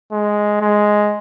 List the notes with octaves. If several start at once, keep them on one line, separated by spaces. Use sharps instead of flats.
G#3
G#3